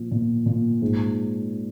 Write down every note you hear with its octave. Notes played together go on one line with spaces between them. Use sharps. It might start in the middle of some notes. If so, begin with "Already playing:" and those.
Already playing: A#2 F3
A#2
A#2
G#2